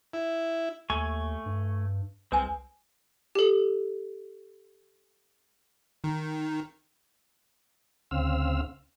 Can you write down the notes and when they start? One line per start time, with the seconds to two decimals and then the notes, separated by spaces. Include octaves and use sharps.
0.13 E4
0.90 D#2 A3 G#5 C#6
1.46 G2
2.32 C2 G#3 C4 B4 G#5
3.35 G4 A4
6.04 D#3
8.11 D2 C#3 C4 F5 E6